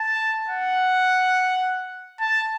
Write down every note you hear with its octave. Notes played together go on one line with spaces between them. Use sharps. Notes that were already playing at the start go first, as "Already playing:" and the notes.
Already playing: A5
F#5
A5